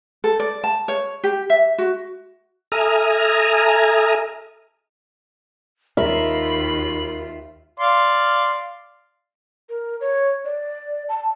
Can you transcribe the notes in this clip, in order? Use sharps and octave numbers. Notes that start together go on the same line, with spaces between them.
A4
D5
A5
C#5
G4
E5
F#4
A4 E5 G#5 A#5 D#6 F6
D#2 F4 A#4 E5 B5
D5 F5 C6
A#4
C#5
D5
A5